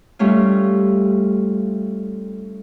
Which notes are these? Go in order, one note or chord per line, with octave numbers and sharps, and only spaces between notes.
G3 A3 C#4 F4